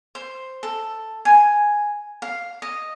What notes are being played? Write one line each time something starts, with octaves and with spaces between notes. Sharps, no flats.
C5
A4
G#5
F5
D#5